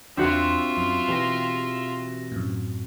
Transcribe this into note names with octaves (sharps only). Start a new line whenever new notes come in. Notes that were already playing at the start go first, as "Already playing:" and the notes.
E2 C4 D4 F4 F#4 E5 E6
F#2
B2 E3 G4 A#6
F#2 A2